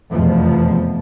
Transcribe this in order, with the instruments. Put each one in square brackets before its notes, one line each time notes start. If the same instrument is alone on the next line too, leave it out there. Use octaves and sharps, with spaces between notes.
[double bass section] F1 E2 B2 F3